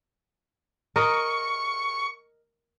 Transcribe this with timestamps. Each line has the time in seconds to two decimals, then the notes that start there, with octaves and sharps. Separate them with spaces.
0.96 A#4 D#5 C#6